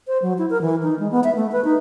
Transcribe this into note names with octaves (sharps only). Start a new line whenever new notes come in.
C5
F#3
E4
A#4
E3
D#4
G#3
B3
E5
A3
B4
D#4